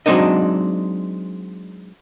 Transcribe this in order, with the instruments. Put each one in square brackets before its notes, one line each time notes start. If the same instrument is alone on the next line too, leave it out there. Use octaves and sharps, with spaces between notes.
[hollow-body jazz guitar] F#3 G#3 C4 D4 D#4 D#5